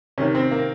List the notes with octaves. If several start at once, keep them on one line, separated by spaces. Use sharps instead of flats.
C3 D#3 C#4
C4
A#3